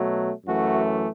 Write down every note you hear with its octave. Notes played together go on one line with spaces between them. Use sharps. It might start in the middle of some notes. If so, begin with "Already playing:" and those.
Already playing: B2 F#3 A3
F#2 E3 A3 F#4